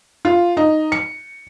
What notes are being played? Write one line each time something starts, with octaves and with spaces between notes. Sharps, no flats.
F4
D#4
C#7